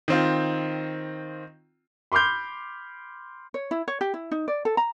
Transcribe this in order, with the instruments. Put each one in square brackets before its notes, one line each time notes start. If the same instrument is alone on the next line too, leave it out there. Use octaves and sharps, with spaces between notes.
[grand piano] D#3 C4 F4
B5 C6 D6 F6 G6
[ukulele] C#5
E4
C#5
G4
E4
D#4
D5
A4
A#5